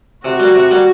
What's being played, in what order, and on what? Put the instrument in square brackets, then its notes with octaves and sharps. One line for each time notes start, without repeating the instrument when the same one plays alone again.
[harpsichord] C3 [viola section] F#4
[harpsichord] G3 A#3
C3
G3 A#3